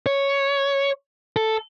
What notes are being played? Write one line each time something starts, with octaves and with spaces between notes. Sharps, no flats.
C#5
A4